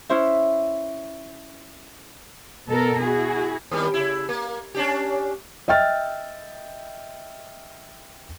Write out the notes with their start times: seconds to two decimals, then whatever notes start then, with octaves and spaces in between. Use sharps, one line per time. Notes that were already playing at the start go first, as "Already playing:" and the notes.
0.09 C#4 E4 C5 E5
2.67 B2 B3 A4 A#4
3.01 E4 F#4 G#4
3.71 D#2 D#3 G3
3.94 C#3 E4
4.29 A#3
4.75 C#4 D4 G4
5.68 D#5 E5 G5 F6 A6